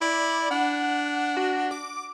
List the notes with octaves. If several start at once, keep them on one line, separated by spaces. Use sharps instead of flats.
E4 D5
D4 F#5
F#4
D6